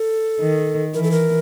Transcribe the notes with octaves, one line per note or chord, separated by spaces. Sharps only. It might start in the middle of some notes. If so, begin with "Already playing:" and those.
Already playing: A4
D#3
E3 A#4
A4
A#4